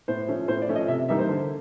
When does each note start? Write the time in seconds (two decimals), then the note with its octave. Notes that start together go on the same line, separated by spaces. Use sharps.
0.08 A2 C5
0.28 F3 A3 C#4
0.48 A2 C5
0.62 D5
0.69 F3 A3 C#4
0.76 D#5
0.88 C3 E5
1.09 E3 G3 A#3 D#4 E5
1.19 C5
1.29 D3